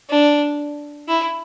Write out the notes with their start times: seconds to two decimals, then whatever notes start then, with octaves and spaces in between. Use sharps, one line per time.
0.10 D4
1.08 E4